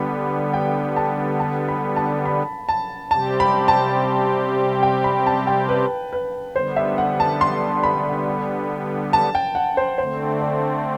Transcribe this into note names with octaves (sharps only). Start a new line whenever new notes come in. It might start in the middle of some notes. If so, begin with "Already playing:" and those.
Already playing: D3 G3 B3 B5
G5
A5
A5
B5
A5
B5
A5
C3 G3 C4 G4 A5
B5
A5
G5
B5
A5
G5
B4
B4
D3 G3 B3 C5
E5
F#5
A5
C6
B5
A5
G5
F#5
C5
D3 A3 C4 C5
D5